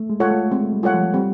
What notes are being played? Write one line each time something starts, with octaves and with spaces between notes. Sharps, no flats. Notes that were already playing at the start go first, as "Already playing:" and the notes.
Already playing: A3
G#3
F4 A4 C#5 F#5
A3
G#3 C4
G3
F4 A4 C#5 F#5
F3
G3 C4